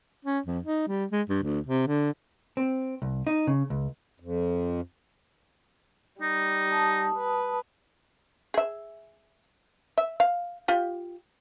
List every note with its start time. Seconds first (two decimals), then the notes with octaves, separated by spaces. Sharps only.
0.25 C#4
0.46 F2
0.65 D#4
0.88 G3
1.11 G#3
1.29 G2
1.43 D2
1.66 C3
1.87 D3
2.57 C4
3.02 C2
3.27 D#4
3.47 C#3
3.70 C#2
4.20 F2
6.21 G3 D#4
6.72 A5 D#6
7.15 B4
8.54 G#4 E5
9.98 E5
10.20 F5
10.68 F4 G4